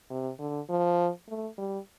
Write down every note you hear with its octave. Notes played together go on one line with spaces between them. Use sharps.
C3
D3
F3
A3
G3